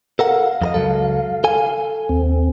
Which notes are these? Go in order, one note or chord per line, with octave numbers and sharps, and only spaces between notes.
A4 A#4 F5 F#5
F2 A#4 D#5
C#2 F#3 A4
A4 G#5
D#2 C4